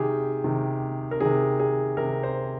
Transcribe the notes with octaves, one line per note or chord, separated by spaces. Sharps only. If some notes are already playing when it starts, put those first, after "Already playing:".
Already playing: C3 D#3 G4 G#4
C3 D#3
A#4
C3 D#3 G#4
G#4
C3 D#3 A#4
C5